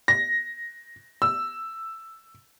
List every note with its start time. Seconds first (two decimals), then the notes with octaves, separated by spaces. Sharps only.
0.08 A#6
1.22 E6